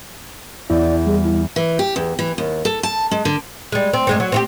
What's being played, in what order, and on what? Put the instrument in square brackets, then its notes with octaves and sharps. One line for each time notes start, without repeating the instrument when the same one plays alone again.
[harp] E2 [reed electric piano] E4 [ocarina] D5
[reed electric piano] G3 [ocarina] G#4
[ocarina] E4
[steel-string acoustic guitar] E3
G4
E2
E3
D#2
A4
A5
G#3
D3
[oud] G3 G#3
C4
G2 G#3 C4
F#3
C4 F4 G4